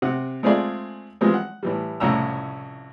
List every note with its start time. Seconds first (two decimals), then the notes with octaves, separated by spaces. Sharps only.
0.02 C3 C4 F#5
0.43 G#3 A3 C4 F4 G#4 D5
1.21 E3 F3 G3 G#3 C4
1.34 F#5
1.63 A2 E3 G3
2.00 C2 F2 A2 C#3 A#5 E6